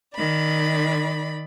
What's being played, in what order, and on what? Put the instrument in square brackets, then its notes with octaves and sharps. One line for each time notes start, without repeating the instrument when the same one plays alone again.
[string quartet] D#3 D5 B5